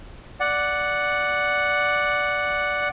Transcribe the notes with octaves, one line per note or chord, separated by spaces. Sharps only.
D5 F#5